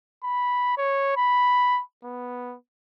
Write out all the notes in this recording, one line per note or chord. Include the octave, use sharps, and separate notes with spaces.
B5
C#5
B5
B3